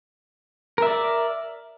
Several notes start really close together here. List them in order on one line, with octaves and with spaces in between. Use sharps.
A#4 E5 D5